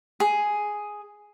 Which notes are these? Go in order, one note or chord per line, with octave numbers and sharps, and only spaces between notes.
G#4